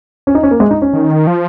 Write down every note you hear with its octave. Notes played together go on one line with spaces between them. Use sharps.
C#4
D#4
C#4
A#3
G#3
D#4
C#4
D#3
F3